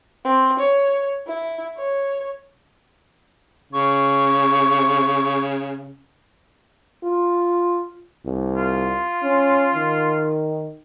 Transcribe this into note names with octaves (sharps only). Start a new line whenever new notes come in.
C4
C#5
E4
C#5
C#3 C#6
F4
C2
F4
C#4
D#3